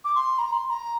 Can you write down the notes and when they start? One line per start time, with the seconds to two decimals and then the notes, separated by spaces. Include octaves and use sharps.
0.05 D6
0.15 C6
0.39 A#5
0.53 C6
0.66 C6
0.70 A#5